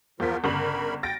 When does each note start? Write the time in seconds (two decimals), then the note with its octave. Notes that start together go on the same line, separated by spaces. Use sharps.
0.20 E2 F3 F4 A#4 B6
0.44 G1 C#3 A#4 B5 F#7
1.03 G5 A6 A#6 D7